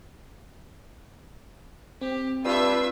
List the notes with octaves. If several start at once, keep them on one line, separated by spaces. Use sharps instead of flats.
C4 G4
G2 F4 B4 E5 E6